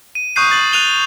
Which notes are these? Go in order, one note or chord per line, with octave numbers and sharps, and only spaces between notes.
D#7
C#6 D#6 F#6 G6 C7 D#7
A6 F#7
F#6 D#7 F7 G7